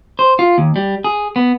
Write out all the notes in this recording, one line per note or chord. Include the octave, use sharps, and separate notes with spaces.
C5
F4
D#2
G3
G#4
B3